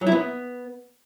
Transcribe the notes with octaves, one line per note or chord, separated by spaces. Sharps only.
F#3
E4
B3